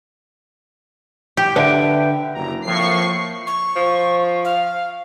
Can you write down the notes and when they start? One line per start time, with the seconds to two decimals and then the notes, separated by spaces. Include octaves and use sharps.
1.37 G4
1.56 D3 B4 E5 G5
2.34 F#1 G4 A#5
2.66 A2 F3 A#3 C4 C#6 C7
3.47 C#6
3.76 F3
4.45 F5